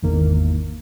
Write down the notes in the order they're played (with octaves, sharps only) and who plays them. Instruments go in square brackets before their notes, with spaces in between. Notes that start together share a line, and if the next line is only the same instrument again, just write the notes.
[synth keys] G#1 E2 D#3 A#3